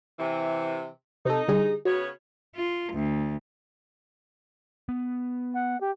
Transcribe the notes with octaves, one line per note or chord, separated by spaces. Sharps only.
C3 E3
C3 D#4 A4
D3 G3 G#4
C#3 B3 F#4 C#5
F4
D2
B3
F#5
G4